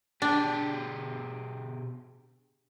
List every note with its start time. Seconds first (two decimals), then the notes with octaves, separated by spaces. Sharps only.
0.22 B2 D4 G4 G#4